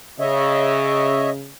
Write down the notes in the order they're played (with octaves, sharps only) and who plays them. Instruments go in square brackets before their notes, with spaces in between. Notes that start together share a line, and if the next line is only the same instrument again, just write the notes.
[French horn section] C#3 [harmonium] C#5 D#5 E5